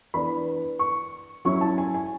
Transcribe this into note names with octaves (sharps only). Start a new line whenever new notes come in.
E3 B3 D4 B5
C#6
F#3 C#4 E4 C#6
A5
G#5
G#5